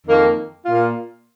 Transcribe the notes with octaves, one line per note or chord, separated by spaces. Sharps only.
F2 D#3 A#3
A#2 A#3 F4